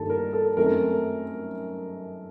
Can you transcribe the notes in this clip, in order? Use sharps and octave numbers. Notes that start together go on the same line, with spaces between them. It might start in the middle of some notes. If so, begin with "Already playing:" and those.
Already playing: G2 D#3 G3 A#3 A4
A#4
A4
F#2 D#3 A3 C4 A#4